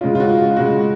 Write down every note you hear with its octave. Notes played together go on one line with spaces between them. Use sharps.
C#3 G#3 C#4 F4
F4
F#4
F4
C#3 G#3 C#4 F#4